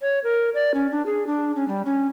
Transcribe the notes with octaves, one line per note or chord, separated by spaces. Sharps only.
C#5
A#4
D5
C#4
D4
G#4
D4
C#4
G3
C#4